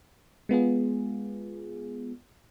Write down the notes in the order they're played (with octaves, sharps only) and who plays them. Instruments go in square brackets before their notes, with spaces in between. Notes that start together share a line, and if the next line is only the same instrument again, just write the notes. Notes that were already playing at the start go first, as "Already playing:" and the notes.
[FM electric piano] G#3 B3 F4 G#4